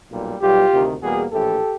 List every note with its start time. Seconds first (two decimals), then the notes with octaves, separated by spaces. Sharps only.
0.11 B1 A#2 G3
0.41 B1 B2 G3 F4 G4
0.71 D2 C3 D#3
1.01 E2 B2 G3 A#3 F#4 G#4
1.32 A#1 A2 E3 G4 A4